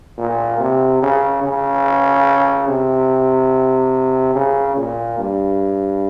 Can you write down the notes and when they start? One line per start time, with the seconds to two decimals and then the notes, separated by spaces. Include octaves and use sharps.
0.18 A#2
0.60 C3
1.02 C#3
1.43 C#3
2.68 C3
4.35 C#3
4.77 A#2
5.19 G2